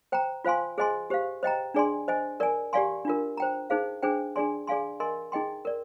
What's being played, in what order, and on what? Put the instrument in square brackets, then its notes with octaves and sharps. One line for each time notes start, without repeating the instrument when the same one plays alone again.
[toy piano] C5 G5 A#5
F4 C5 F5 G#5 C6
G#4 C5 D#5 G#5 C6
G4 C5 F5
C5 D#5 G5 A#5
D4 G#4 D5 G#5 C6
C5 D#5 G#5
A#4 D5 G#5
G4 D5 F5 G#5 C6
D4 F4 A#4
C5 G5 A#5
D#4 G#4 C5 F5
D4 G#4 C5 G5
D4 G#4 D5 G#5 C6
G#4 D5 F5 G#5 C6
A#4 D#5 G#5 C6
D#4 G#4 D#5 G5 C6
A#4 D5